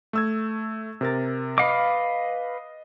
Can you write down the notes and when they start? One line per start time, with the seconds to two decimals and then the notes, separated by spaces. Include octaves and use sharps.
0.13 A3 E6 G#6
1.01 C3 A#4 A6
1.58 B4 D#5 F5 D6